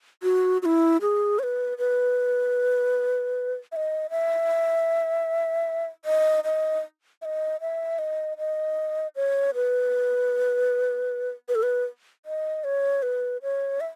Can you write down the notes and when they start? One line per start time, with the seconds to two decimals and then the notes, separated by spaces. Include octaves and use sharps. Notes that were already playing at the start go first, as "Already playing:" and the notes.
0.23 F#4
0.62 F#4
0.65 E4
1.01 G#4
1.39 C#5
1.43 B4
1.78 B4
3.72 E5
3.76 D#5
4.10 E5
6.05 D#5
6.44 D#5
7.22 E5
7.25 D#5
7.61 E5
7.99 D#5
8.38 D#5
9.16 C#5
9.55 B4
11.49 B4
11.55 A4
11.63 B4
12.26 D#5
12.64 C#5
13.02 B4
13.42 C#5
13.81 E5